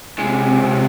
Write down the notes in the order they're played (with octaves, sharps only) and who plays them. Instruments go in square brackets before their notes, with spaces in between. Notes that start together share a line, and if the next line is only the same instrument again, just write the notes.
[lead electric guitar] D2 G#3 [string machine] C3